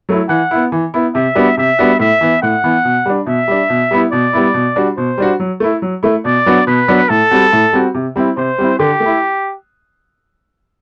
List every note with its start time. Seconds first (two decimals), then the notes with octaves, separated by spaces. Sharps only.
0.09 F#3 A3 E4
0.29 E3 F#5
0.51 B3 E4
0.72 E3
0.94 B3 E4
1.15 C3 E5
1.35 G3 B3 D4 F#4
1.57 C3 E5
1.79 G3 B3 D4 F#4
1.99 A2 E5
2.21 E3 B3
2.42 A2 F#5
2.64 E3 B3
2.85 B2
3.06 G3 D4
3.26 B2 E5
3.48 G3 D4
3.70 B2
3.91 G3 B3 E4
4.12 B2 D5
4.33 G3 B3 E4
4.54 B2
4.76 G3 D4 F#4
4.97 B2 C5
5.18 G3 D4 F#4
5.40 F#3
5.60 A3 E4
5.82 F#3
6.03 A3 E4
6.25 B2 D5
6.46 F#3 B3 D4 F#4
6.67 B2 B4
6.88 F#3 B3 D4 F#4
7.09 A2 A4
7.31 G3 C4 F#4
7.53 A2
7.73 G3 C4 F#4
7.95 C3
8.16 G3 C4 E4
8.37 C3 C5
8.58 G3 C4 E4
8.79 D3 G4
9.00 A3
9.06 E4